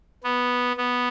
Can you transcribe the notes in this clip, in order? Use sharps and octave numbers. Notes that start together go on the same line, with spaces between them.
B3
B3